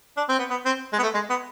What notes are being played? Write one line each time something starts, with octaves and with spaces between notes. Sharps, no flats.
D4
C4
B3
B3
C4
G#3
B3
A3
G#3
B3